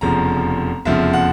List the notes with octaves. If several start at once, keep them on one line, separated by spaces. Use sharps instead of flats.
F1 E2 C#3 F3 A#5
F1 E2 C#3 F3 E5
F#5